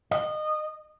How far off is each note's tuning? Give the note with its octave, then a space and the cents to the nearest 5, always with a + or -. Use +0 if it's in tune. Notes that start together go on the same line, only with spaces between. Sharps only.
D#5 -25